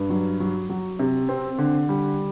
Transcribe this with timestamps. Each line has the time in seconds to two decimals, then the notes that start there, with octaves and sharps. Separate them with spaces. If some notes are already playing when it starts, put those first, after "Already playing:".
Already playing: G2
0.10 F#3
0.40 F#3
0.70 F#3
0.99 C3
1.29 C4
1.58 D3
1.89 G3